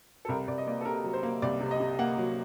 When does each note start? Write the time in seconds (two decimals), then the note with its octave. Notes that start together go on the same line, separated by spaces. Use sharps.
0.25 A4
0.29 C2 A#4
0.48 C2 D5
0.58 D#5
0.67 A#3 D5
0.81 A4
0.85 C3 A#4
1.04 F#3
1.14 C5
1.23 A#3
1.42 C2 D5
1.61 C3
1.71 D#5
1.80 C3
1.99 A#3 F#5
2.18 F#3